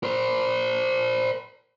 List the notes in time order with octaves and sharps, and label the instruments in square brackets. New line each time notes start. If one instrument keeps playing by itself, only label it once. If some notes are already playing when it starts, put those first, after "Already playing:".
[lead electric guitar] A#4 C5